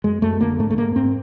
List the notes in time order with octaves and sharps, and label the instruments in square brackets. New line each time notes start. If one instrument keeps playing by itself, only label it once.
[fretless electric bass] F#2 G#3
F#2 A3
D3 A#3
G#2 A3
A3
G#2 A#3
G#2 C4